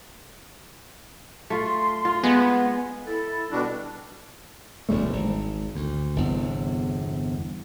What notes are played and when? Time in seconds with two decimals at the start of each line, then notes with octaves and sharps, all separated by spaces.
1.50 A3 F4 C6
2.05 F4
2.23 G#3 B3
3.07 E4 A4
3.52 B2 D3 G3 D4 F#4
4.89 E1 D2 G3 A3
5.13 G#1
5.75 D2
6.16 G1 E2 C3